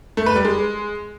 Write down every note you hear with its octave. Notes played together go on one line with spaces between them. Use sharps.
A3
B4
G3
G#3